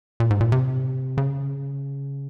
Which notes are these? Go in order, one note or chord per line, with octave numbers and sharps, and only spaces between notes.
A#2
G#2
A#2
C3
C#3